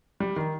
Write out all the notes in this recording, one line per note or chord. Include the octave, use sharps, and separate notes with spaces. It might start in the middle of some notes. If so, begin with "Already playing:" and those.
G3
D#3